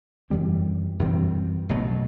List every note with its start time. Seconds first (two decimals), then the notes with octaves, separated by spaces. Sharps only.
0.30 F#2 E3 G3 C4
0.99 F#2 E3 G3 C4
1.69 B1 B2 F#3 A3